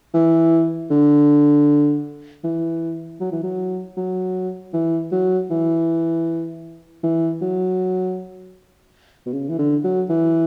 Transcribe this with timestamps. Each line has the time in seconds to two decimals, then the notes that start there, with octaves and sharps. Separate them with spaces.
0.14 E3
0.91 D3
2.44 E3
3.20 F#3
3.32 E3
3.43 F#3
3.97 F#3
4.73 E3
5.12 F#3
5.50 E3
7.03 E3
7.41 F#3
9.26 B2
9.33 C#3
9.49 E3
9.58 D3
9.84 F#3
10.09 E3